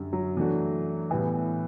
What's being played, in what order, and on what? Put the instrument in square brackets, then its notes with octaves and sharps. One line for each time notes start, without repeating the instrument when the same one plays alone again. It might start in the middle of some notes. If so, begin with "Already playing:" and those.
Already playing: [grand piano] F#2 D3 G3
[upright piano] F#3
[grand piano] E3 A3 D4 F#4
[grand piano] A2 G3 B3 E4 [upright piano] E3